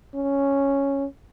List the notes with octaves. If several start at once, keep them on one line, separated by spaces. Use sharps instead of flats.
C#4